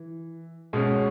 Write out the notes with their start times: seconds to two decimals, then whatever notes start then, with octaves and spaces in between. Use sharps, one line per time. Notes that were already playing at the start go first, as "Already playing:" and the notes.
Already playing: E3
0.73 B2 G#3 C#4